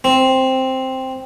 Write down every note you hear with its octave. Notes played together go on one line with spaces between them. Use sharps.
C4